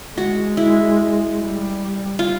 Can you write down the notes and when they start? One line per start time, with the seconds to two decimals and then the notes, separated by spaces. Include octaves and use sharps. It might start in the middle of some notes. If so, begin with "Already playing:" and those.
0.17 G#3 F#4
0.57 E4
1.39 G3
2.19 F4